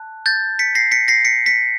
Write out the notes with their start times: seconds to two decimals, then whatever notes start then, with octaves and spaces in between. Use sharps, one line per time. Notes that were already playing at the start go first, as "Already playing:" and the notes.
Already playing: A5 F#6
0.26 G6 A6
0.59 B6 C#7
0.75 A#6 C7
0.92 B6 C#7
1.08 A#6 C7
1.25 B6 C#7
1.46 B6 C#7